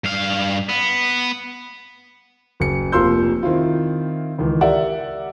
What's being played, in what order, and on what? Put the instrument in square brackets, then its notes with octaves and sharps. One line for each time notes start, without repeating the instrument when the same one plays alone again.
[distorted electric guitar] G2 F5
B3
[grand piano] F#1 C#7
F1 F3 A#3 C6 E6 G6
D#3 C4 E4 F4
C#2 D#3 E3
G4 A#4 D5 E5 F#5